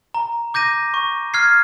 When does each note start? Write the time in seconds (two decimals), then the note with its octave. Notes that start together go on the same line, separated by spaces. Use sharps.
0.14 A#5
0.54 D6 G6 A#6 D#7
0.94 C#6
1.34 F6 G#6 C7